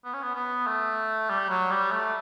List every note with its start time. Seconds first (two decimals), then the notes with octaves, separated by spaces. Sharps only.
0.05 B3
0.13 C#4
0.23 B3
0.35 B3
0.67 A3
1.30 G3
1.50 F#3
1.71 G3
1.92 A3